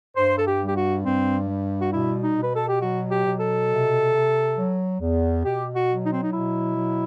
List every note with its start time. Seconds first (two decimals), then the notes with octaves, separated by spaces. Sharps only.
0.16 G2 C5
0.37 A4
0.46 G4
0.60 G3
0.67 G4
0.75 F#4
1.04 G2 C4
1.48 G3
1.81 F#4
1.92 B2 E4
2.22 D#4
2.37 B2
2.42 B4
2.55 A4
2.68 G4
2.80 F#3 F#4
3.10 G4
3.24 B2
3.39 A4
3.68 C3
4.12 C3
4.56 F#3
5.00 E2
5.44 B2 G4
5.73 F#4
5.88 F#3
6.03 D#4
6.12 C4
6.21 D#4
6.32 B2 E4
6.76 F#3